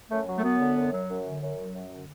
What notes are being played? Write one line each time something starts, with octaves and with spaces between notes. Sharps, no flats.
F#2 A3
F#3
A3
F#2 B3
D3
F#2
F#3
F#2
D3
F#2
F#3
F#2
D3